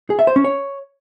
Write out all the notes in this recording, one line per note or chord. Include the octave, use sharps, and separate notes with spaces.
G#4
E5
C5
C#4
C#5